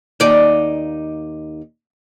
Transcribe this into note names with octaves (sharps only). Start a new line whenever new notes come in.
D#2 D#4 D5